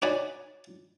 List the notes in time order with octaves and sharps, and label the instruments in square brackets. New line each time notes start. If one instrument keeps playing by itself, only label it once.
[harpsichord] D#4 F#4 C#5 D5 G#5 B5